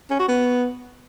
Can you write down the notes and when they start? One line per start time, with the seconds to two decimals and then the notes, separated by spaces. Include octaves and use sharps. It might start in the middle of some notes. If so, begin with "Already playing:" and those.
0.11 C#4
0.20 F#4
0.28 B3